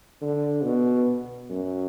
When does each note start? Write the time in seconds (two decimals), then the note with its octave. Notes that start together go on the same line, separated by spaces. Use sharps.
0.21 D3
0.63 B2
1.50 F#2